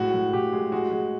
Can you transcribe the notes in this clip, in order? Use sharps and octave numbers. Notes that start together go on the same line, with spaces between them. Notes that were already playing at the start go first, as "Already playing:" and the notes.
Already playing: A2 G#3 F#4
A2
A2 G4
G#3
G#3 F#4
G#3